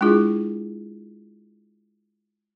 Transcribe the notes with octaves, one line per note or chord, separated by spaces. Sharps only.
G#3 D4 E4 F4 G#4